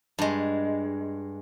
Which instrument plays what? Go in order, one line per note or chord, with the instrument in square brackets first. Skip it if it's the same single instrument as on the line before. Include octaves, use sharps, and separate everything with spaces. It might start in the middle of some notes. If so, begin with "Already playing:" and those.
[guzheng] G2 G#3